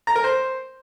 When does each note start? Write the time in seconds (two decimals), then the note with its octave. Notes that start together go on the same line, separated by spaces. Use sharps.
0.07 A#5
0.16 A#4
0.24 C5